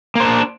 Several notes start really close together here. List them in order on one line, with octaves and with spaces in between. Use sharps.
A#3 C5 D4